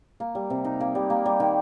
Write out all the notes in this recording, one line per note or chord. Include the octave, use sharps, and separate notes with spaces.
A#3
G3
C3
D#4
A#3
G3
A#3
G3
D#3